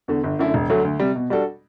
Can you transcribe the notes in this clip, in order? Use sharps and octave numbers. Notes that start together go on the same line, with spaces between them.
E2 D3
G1
F#2 D3 A3 E4
E1
D2 D3 F#3 A3
D2
C3 G3
B2
G3 D4 F#4 A4